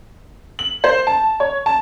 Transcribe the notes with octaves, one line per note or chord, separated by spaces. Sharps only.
F#7
C5
A5
C#5
A5